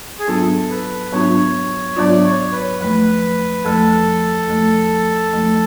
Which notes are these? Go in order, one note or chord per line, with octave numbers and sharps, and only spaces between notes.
G#4
G#2 F#3 B3 D4 F4 A4
B4
G#2 F#3 B3 D4 F4 C#5
G#2 F#3 B3 D4 F4 D5
C#5
B4
F2 F3 A3 B4
F2 F3 A3 A4
F2 F3 A3
F2 F3 A3